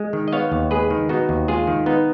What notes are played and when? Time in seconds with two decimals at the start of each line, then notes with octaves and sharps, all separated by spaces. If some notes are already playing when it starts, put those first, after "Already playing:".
Already playing: G#3
0.13 D#3
0.28 D#5
0.33 B3 C#5 F5
0.52 D#2
0.71 G#3 G#4 B4
0.90 D#3
1.09 B3 D#4 F#4
1.29 D#2
1.48 G#3 F4 G#4
1.67 D#3
1.86 B3 D#4